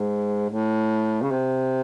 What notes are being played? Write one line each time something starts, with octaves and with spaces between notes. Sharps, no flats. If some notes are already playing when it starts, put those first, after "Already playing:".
Already playing: G#2
A2
C#3
C3